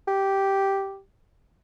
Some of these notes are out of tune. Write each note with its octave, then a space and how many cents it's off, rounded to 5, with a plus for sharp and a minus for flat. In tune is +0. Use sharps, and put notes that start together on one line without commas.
G4 -5